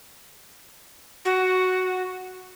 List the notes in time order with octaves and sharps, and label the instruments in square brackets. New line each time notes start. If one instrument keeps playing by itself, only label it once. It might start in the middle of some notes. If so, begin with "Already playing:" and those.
[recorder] F#4